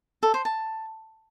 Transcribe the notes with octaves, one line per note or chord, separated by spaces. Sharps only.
A4
C5
A5